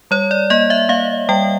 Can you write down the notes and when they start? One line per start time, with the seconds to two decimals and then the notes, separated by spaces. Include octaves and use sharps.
0.11 G3 C#5
0.31 D5
0.50 A#3 D#5
0.70 E5
0.89 A#3 F5
1.29 G3 G5